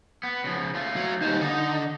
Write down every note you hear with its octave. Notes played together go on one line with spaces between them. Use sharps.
B3
C#3 F3
A3 F4
F#3
D#2 G3 D#4 C5
D3 D#4 D#5